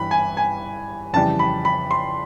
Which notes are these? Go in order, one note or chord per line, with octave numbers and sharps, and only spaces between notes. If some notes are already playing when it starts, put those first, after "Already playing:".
Already playing: G2 E3 G3 B5
G#5
G#5
F2 C#3 E3 G3 A5
B5
B5
C6